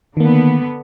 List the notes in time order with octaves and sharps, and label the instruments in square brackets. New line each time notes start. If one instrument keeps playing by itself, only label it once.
[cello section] D3 B3 [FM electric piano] D#3 A#3